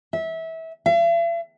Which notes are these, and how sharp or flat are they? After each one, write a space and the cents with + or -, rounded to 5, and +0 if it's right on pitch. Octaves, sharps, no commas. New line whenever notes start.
E5 -25
E5 +45